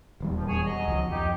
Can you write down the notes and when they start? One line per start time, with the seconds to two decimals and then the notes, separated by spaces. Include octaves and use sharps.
0.20 D#1 E2 G3
0.33 F2 F3
0.48 G#4 C#5 G#5
0.65 F#3 D#5
0.88 C#2 F3
1.11 F2 D#4 G4